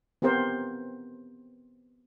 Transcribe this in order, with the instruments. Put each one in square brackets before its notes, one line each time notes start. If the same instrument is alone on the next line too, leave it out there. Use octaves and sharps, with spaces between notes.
[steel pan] B3 C4 G4 A#4 C5